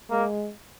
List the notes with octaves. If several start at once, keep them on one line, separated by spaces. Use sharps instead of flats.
G#3 A#3